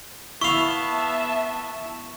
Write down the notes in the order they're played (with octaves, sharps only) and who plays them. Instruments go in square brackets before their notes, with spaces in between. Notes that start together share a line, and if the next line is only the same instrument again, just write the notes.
[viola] B3 [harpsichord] E4 F5 [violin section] E5 A5 [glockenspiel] C#6